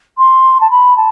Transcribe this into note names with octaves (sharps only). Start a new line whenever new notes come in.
C6
A5
B5
A5